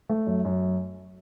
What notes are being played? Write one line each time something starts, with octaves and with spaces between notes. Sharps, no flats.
A3
F#2
F#2